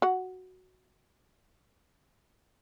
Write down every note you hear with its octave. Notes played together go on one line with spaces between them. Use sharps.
F#4 F#5